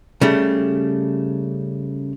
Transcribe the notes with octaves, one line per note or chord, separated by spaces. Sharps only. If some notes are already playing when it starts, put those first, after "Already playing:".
C#3 G3 A3